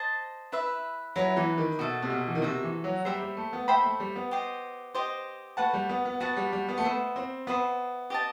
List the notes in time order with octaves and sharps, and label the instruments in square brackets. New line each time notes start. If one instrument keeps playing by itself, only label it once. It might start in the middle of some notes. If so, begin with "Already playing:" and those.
Already playing: [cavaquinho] C5 D#5 A5
E4 B4 E5
[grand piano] F#3 [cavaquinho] E4 B4 E5
[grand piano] E3
D#3
[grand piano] B2 [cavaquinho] F#4 A4 E5
[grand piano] C3
B2
E3
D#3
[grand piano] C3 [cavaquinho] F#4 A4 E5
[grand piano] E3
F#3
[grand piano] G3 [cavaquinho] C5 E5 G5 B5
[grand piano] G3
A3
B3
[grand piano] A3 [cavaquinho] C5 E5 G5 B5
[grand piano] A3
G3
B3
[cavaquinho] G4 C5 D#5
G4 C5 D#5
[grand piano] A3 [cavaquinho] F#4 B4 F#5 A5
[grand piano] G3
B3
B3
[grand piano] B3 [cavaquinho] F#4 B4 F#5 A5
[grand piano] G3
G3
B3
A3
[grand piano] B3 [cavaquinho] C5 E5 B5 D#6
[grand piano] C4
[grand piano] B3 [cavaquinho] C5 E5 B5 D#6
[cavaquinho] G4 D#5 A5